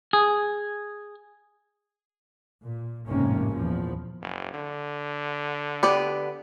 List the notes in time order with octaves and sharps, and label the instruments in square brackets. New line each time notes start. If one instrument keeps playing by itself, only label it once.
[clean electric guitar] G#4
[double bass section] A#2
G#1 F2 A2 C3 A#3 C#4
E2 A#2 F3
[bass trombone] F#1
D3
[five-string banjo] B3 G4 D5